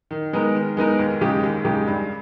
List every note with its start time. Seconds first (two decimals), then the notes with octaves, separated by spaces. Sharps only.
0.11 D#3
0.33 G#3 B3 D#4 A#4
0.55 D#3
0.77 G#3 B3 D#4 A#4
0.99 D#2
1.21 C#3 G#3 D#4 G4
1.43 D#2
1.65 C#3 G#3 D#4 G4
1.87 G2